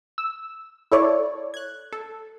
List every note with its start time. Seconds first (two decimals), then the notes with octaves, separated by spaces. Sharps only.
0.18 E6
0.92 E4 A4 C#5 D5
1.54 F#6 G#6
1.92 A4